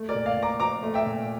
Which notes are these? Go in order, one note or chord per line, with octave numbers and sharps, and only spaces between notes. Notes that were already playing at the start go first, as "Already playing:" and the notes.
Already playing: A3
A#4 D5
A#2
D5 F5
A#2
A#5 D6
F3 A#5 D6
A3
E5 G5
A#2